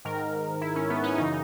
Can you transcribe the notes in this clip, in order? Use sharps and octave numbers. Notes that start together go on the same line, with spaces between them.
G#2 D#3 A#4
E4
C#4
B3
C#4
F#2 C#3 E3 D#4